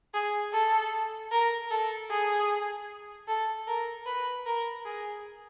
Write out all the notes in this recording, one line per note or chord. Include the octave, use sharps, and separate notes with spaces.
G#4
A4
A#4
A4
G#4
A4
A#4
B4
A#4
G#4